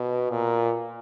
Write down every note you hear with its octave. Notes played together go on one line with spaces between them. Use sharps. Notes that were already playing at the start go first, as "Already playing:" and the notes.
Already playing: B2
A#2